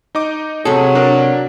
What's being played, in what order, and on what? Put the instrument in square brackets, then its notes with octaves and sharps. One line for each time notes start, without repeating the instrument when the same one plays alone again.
[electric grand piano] D#4 D#5 D6
[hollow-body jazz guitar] C3 A4 [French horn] F#3 [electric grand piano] G#4
[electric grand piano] D4 A#4 D5